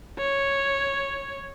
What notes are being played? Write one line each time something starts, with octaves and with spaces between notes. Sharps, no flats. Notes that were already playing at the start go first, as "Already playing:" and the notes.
C#5